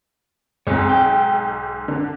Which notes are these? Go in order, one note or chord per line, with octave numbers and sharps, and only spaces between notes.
B1 G#2 C4 C#5
G5
D3